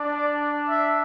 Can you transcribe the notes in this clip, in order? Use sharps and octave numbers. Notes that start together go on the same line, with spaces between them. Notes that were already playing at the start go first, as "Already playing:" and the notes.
Already playing: D4 D5
E5